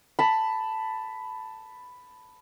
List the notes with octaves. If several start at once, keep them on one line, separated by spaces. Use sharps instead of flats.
A5 B5